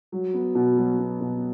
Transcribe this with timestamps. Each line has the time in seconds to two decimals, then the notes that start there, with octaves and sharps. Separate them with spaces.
0.12 F#3
0.34 B3
0.55 B2
0.78 F#3
0.99 B3
1.21 B2